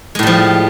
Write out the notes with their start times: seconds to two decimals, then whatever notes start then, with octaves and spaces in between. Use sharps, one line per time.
0.15 G#3
0.19 A2
0.23 G3
0.27 F3